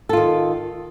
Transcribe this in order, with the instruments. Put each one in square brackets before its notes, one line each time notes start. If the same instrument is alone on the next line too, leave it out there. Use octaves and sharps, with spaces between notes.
[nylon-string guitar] A4
F4
D#3